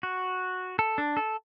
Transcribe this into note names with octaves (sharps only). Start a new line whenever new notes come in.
F#4
A4
D4
A4